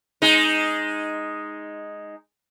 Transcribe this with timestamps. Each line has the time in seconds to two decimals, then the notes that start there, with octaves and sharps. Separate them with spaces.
0.22 G#3 D#4